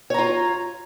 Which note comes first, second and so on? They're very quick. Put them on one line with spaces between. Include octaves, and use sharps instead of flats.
C#5 A#5 F4